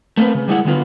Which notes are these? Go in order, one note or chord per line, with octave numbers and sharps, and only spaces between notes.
A3 A#3 C4 B4
C#3
G3 G#3 E4 F#5
D3 F#3 B3 F4 B4